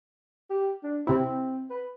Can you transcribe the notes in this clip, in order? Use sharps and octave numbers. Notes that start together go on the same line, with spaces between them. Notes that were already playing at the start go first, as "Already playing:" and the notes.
G4
D4
C3 C4 E4
B4